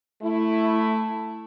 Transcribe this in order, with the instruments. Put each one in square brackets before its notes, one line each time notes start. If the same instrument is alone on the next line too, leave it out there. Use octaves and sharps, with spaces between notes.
[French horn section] A3 E4